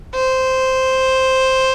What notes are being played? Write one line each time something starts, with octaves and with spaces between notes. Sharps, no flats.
C5